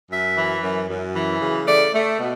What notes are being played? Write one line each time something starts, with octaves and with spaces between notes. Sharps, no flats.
F#2 E5
E3
F#2
F#2
E3
C#3
A3 D5
A3
B2